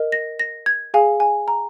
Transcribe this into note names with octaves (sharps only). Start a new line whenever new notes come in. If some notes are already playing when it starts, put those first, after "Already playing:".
Already playing: A#4 D#5
A#6
A#6
G#6
G#4 F5 G#5
G#5
A#5